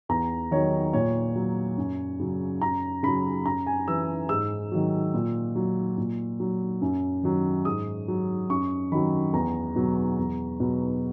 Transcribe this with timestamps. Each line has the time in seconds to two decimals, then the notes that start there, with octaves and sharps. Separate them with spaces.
0.09 E2 A#5
0.51 D#3 F#3 C#5
0.93 A#2 C#5
1.35 F#3
1.77 F#2
2.20 C#3 F#3
2.61 F#2 A#5
3.03 C#3 F#3 B5
3.46 F#2 A#5
3.67 G#5
3.88 E3 E6
4.29 G#2 E6
4.72 D#3 F#3
5.14 A#2
5.55 F#3
5.98 A#2
6.40 F#3
6.82 F#2
7.23 D#3 F#3
7.65 G#2 D#6
8.08 F#3
8.50 F#2 C#6
8.92 D#3 F#3 B5
9.33 E2 A#5
9.76 B2 F#3
10.18 E2
10.60 B2 F#3